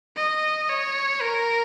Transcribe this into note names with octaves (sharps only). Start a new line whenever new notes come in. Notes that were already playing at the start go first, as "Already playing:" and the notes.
D#5
C#5
A#4